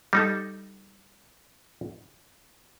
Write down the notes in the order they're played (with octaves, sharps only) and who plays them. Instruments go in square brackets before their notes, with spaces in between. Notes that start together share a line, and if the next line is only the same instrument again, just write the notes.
[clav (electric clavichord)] G3 D#4 A4